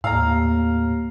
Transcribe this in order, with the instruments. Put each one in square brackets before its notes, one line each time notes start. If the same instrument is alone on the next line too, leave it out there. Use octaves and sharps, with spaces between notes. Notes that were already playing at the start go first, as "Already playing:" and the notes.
[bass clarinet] D#2 [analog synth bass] A2 [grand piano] F5 A#5